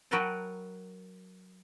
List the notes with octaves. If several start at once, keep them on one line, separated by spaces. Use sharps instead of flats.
F#3 F#4 A#4 B4 G5 A5